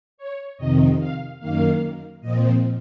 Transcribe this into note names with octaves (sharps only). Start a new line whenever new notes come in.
C#5
F2 C3 D#3 D#5
F5
F#2 D#3 A#3 F5
A#2 F3 C4 D#5